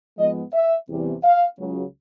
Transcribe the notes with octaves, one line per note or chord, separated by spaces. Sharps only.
G#2 F3 G#3 B3 D#5
E5
E2 C3 E3 G3
F5
C#2 C#3 F#3